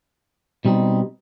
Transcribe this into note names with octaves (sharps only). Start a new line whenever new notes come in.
B2 G3 C4 D#4